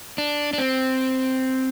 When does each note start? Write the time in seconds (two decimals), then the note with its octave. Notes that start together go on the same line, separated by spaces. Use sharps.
0.18 D4
0.53 D4
0.58 C4